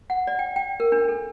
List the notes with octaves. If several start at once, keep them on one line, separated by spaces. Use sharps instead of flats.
F#5
D5
G5
G5
A#4
D4
A4